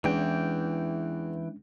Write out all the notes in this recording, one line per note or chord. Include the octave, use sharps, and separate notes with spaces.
E2 E3 G#3 C#4 D4 G5